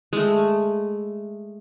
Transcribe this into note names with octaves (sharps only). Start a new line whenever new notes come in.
G#3 A3